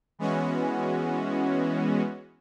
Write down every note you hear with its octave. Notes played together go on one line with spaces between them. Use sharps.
E3 G#3 B3 C#4 F#4